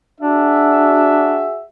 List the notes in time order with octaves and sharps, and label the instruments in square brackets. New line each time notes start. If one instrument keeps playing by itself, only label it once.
[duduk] D4 [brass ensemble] F#4 G#4 E5